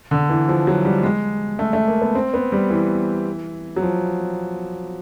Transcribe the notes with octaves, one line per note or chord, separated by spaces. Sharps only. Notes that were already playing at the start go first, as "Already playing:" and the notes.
D3
E3
F3
F#3
G3
G#3
A3
A3
A#3
B3
C4
B3
G3
E3
F#3
F3